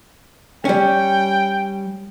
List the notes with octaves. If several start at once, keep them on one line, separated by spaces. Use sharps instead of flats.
G3 C#4 G5